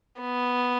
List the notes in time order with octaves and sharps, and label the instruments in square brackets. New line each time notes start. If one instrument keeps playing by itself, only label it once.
[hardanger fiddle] B3